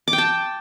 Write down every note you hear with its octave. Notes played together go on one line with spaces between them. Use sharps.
D6
G5
A5